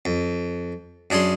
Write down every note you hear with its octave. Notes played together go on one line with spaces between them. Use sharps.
F2
F#2 D4 G#4 C#5 C6